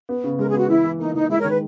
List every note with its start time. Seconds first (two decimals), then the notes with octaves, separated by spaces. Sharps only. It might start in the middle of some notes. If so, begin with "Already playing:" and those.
0.09 B3
0.24 C#3
0.39 G#3 A#4
0.49 G#4
0.54 B3
0.59 F#4
0.69 E3 E4
0.84 E3
0.99 A#3 D#4
1.15 E3 D#4
1.30 G#3 E4
1.40 A#4 C#5
1.44 D#3
1.50 B4